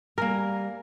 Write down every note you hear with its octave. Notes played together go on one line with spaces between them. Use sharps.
G3 A#3 A#4 G#5